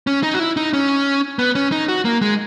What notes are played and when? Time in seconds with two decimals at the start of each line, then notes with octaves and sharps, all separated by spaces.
0.07 C#4
0.23 D#4
0.34 F#4
0.39 E4
0.57 D#4
0.73 C#4
1.39 B3
1.55 C#4
1.72 D#4
1.88 F#4
2.05 A#3
2.22 G#3